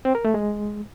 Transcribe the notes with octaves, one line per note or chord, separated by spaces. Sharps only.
C4
A#4
A3
G#3